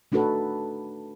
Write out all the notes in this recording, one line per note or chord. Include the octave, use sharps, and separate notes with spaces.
A3 D4 D#4 F#4 A4 B4